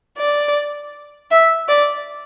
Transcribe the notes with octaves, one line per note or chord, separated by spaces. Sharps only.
D5
E5
D5